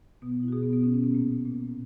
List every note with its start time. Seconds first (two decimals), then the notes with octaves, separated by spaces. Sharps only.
0.22 B2 B3
0.43 E4
0.48 F#4
0.52 B2 G#4
0.63 B3
0.73 B3
0.83 B2 C#4
0.94 C#4
1.04 B3
1.14 A#2 A#3
1.46 A#2